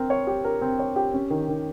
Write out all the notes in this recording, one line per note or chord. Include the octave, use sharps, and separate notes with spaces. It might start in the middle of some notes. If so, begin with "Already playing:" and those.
Already playing: C4 A#4
C#5
G4
A#4
C4
C#5
G4
C#4
D#3
D#3